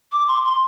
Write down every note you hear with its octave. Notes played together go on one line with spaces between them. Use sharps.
D6
C6
C6